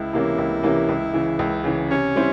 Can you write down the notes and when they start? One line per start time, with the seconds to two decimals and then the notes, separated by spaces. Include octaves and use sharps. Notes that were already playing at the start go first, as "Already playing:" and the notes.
Already playing: C#2 E4
0.13 C3 E3 A#3 C#4
0.38 C#2
0.63 C3 E3 A#3 C#4
0.89 C#2
1.13 C#3 E3
1.39 C#2
1.64 C#3 E3
1.90 C3 C#4
2.16 G3 C4 E4